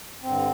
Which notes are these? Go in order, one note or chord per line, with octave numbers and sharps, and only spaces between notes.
G2 D3 C4